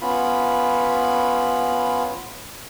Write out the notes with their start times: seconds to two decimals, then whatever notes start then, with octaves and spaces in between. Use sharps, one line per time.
0.01 B3 C#4 F4 B5